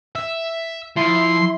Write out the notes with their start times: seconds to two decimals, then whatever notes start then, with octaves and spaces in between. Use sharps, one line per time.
0.16 E5
0.97 F3 E4 C6